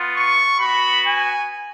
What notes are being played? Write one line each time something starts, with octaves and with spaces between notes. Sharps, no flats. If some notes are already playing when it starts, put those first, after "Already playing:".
Already playing: B3 F4
C#6
B3 F#4 B5
G#5